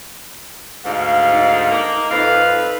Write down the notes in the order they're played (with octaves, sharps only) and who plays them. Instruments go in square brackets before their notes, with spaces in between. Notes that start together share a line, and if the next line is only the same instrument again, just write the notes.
[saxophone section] D2 G#2 [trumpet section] F5
[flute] D#4
[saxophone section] A#3
[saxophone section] F2 F5 [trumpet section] A4 B4